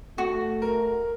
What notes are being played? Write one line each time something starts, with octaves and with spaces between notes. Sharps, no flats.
A3 F#4
A#4